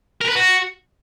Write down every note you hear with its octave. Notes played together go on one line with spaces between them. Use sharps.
A#4
B4
F#4